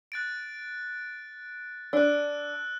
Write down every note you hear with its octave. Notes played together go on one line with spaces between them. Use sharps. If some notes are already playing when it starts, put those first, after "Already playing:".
F#6 A6 D7
D4 E6 F#6